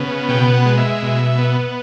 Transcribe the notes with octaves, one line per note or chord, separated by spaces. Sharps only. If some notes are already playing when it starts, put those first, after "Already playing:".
Already playing: C#3 B3
B2 G5
F#5
G#3
E5
B2
B3